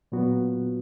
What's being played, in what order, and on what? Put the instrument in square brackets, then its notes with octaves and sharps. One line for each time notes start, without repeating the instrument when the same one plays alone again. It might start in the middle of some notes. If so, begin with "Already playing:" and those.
[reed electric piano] A#2 F#3 B3 F#4